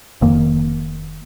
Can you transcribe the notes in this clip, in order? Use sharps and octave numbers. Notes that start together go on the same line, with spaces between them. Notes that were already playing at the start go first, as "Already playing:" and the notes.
F1 F2 D#3 A#3